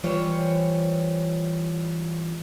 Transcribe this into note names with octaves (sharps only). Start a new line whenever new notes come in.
E3 G3 F4 C5 C#5